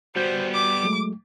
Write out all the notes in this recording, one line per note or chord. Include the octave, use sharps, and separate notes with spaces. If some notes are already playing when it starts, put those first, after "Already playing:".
G3 B3 F#4 C5 G6
D6
F#3 G#3 A3